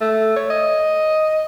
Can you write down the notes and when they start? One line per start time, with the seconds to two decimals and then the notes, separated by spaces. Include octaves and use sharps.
0.01 A3
0.37 C#5
0.50 D#5